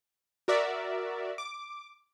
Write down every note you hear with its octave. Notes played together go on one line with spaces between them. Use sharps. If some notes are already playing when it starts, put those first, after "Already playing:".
F#4 A#4 D5 E5
D6